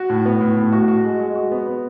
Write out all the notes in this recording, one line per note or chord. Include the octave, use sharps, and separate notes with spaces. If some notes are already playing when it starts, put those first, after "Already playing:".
Already playing: F#4
A2
B3
A2
A2
F#4
F#4
G#3
G#3
F#4
B3
B3